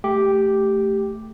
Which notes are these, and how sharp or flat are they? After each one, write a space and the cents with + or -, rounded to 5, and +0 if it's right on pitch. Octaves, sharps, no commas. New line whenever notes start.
A3 +0 G4 +0